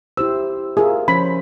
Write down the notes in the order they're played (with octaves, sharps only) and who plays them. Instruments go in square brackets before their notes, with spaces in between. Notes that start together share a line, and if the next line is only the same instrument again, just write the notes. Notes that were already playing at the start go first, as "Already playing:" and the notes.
[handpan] E4 G4 C5 [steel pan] E6
[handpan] F4 A#4 E5 [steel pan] G#4
[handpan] F3 C#4 C5 [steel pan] B5